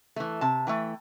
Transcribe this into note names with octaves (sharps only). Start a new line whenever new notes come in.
E3 A3
C3 A5
E3 A3 G5